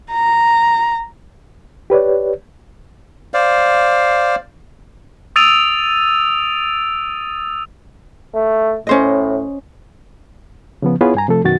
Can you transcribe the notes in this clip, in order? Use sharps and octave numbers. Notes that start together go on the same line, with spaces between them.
A#5
G4 B4 C#5 D5
C5 D5 F5
D#6 E6 A6 D7 D#7 F7
A3
A2 C#4 C5 D#5
C#3 F3 B3
B3 E4 F4 G#4 B4 C#5
G2 G#5 A#5
C3 F3 A3 A4
F#2 B2 D#3 F#4 A6